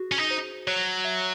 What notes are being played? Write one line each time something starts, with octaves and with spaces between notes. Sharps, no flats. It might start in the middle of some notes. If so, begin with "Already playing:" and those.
Already playing: F#4 G#4
C#4
D#4
C5
F#3 C#5
E5